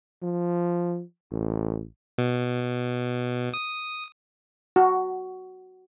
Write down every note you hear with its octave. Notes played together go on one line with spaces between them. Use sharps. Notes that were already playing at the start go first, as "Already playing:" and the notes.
F3
A1
B2
D#6
F#4